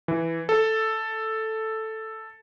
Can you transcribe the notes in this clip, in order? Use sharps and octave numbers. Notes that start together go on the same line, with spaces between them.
E3
A4